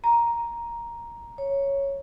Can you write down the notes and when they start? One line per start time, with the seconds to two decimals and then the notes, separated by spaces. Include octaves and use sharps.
0.04 A#5
1.38 C#5